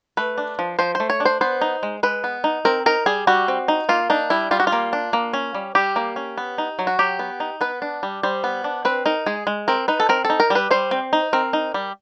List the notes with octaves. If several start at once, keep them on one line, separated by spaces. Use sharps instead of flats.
A3 B4
D4
F3
F3 C5
A3 C5
C#5
D4
C5
B3 C5
D#4
G#3
G#3 B4
B3
D#4
C4 A#4
D#4 A#4
G3 G#4
G3 F#4
C4
D#4
A#3 F4
D4 D#4
G3 E4
G3 F4
F#4
F4
A#3
D4
A#3
C#4
G3
G3 G4
A#3
C#4
B3
D#4
F#3
F#4
F#3 G4
B3
D#4
B3 B4
D4
G3
G3 C5
B3
D4
C4 B4
D#4 A#4
G#3 G#4
G#3
C4 A#4
D#4 B4
A4
C4 A#4
A4
D#4
A#4
G3
B4
G3 C5
C4
D#4
C4 A#4
D#4
G3